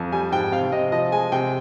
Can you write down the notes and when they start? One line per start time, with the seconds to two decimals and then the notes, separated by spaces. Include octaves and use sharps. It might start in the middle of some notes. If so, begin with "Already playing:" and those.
Already playing: F2
0.12 G3 G#5
0.32 G#2 G5
0.52 C3 F5
0.72 C3 D#5
0.92 F3 D#5
1.12 G#3 G#5
1.32 C3 G5